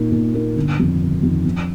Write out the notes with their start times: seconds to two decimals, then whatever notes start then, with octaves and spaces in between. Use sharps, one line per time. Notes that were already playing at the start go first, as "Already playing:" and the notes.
Already playing: A#2 A#3 D#4 A#4
0.12 A#2
0.34 A#3 D#4 A#4
0.56 G1
0.78 F2 D#3
1.01 G1
1.23 F2 D#3
1.45 F2